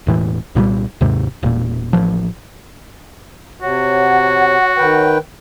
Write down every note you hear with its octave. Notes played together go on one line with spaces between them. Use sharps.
E1 A2 E3
C2 A#2 F#3 G3
D#2 G#2 C3
E1 A#2
A1 F3
C3 F#4 C#5 F#5
D#3 B4 G5